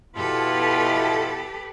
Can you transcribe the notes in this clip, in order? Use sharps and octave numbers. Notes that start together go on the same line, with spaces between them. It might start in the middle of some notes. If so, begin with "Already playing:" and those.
B2 E4 F4 G4 A4 B4